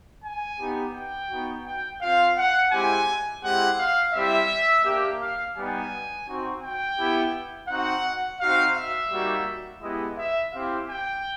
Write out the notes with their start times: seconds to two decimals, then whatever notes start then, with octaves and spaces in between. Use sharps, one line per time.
0.24 G#5
0.59 B3 D#4 G4
0.95 G5
1.30 B3 D#4 F#4
1.65 G5
2.01 C4 F4 F5
2.37 F#5
2.71 G#3 C4 E4 G4 G#5
3.43 G#3 C4 E4 G4 F#5
3.78 F5
4.14 G3 C4 E4 G4 E5
4.85 A#3 D4 G4
5.20 F5
5.56 G3 B3 D#4 G4 G#5
6.27 C4 D#4 F#4
6.62 G5
6.98 B3 E4 G4
7.68 C4 D#4 F#4 F#5
8.40 C4 D#4 F#4 F5
8.76 E5
9.11 G3 A#3 D#4 F#4
9.81 G#3 B3 E4 G4 D#5
10.17 E5
10.53 C4 E4 G4 F5
10.89 G5